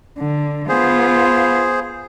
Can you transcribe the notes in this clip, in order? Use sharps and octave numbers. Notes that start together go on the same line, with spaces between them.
D3
B3 F4 G#4 C5